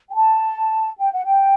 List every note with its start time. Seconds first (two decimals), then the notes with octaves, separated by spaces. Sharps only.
0.10 G5
0.14 A5
0.99 G5
1.12 F#5
1.25 G5